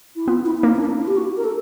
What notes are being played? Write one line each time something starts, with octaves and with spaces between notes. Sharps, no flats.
E4
B3 F4
E4
E4
A#3 D#4
C#4
D4
E4
G4
F#4
A#4
A4